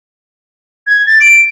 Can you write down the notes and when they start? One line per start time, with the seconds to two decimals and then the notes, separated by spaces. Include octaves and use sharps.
0.87 G#6
1.07 A6
1.21 D7